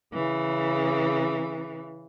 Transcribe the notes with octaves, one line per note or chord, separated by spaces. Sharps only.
C#3 E3